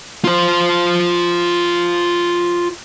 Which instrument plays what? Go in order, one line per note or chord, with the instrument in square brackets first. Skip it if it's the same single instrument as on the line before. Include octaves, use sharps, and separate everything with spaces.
[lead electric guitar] F4 C5